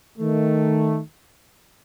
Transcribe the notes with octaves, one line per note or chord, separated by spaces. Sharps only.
D#3 A3